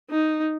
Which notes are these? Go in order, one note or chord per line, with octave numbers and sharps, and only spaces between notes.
D#4